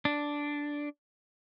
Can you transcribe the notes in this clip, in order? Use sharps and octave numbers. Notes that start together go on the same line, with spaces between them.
D4